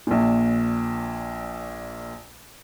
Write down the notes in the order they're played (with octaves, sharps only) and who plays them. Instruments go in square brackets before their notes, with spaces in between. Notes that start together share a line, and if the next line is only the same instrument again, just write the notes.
[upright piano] A#1 A#2